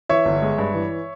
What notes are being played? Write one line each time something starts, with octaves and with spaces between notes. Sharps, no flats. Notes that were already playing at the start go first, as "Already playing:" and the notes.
E3 C#5 E5
G1
G#3
G2
E3